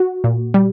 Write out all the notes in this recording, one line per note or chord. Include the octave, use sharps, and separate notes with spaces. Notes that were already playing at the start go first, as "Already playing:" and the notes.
Already playing: F#4
A#2
G3